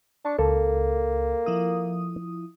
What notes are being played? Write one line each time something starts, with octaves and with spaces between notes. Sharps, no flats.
D4 A5 C#6
C#2 A#3 A4
F3 E4 D#6